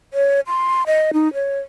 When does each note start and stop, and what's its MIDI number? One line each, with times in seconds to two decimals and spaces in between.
0.13 0.40 73
0.47 0.83 84
0.87 1.11 75
1.13 1.32 63
1.34 1.59 73